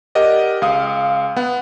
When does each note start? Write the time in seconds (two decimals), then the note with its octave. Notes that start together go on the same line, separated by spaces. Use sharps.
0.15 G4 A#4 D5 D#5 F#5
0.62 C#2 F5 D#6
1.36 B3 F#5